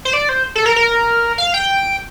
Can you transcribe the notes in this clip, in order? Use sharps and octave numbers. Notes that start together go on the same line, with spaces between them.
C5
D5
C5
A4
A#4
A#4
F5
G5